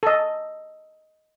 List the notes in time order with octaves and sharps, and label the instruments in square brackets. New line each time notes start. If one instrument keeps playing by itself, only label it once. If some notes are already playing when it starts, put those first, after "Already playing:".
[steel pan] A4 D#5